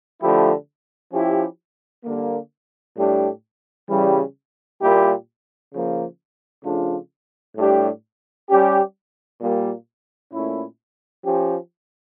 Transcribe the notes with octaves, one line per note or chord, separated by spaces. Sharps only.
D3 F3 A3 E4 G4
F3 C#4 E4 G4
D3 G3 A#3
A2 G3 D4 G4
C#3 E3 G3
A#2 G3 A#3 E4 G4
C#3 F3 A#3
C#3 F3 A3 D4 F4
A2 G3 D4 G4
G3 C#4 G4
A#2 G3 A#3
A#2 A3 C#4 E4
F3 C#4 G4